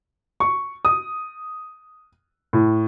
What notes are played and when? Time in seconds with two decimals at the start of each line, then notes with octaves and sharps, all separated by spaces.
0.40 C#6
0.85 D#6
2.53 A2